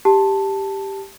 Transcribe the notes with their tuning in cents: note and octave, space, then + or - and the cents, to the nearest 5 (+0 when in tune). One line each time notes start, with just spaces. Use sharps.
G4 +0 A5 +0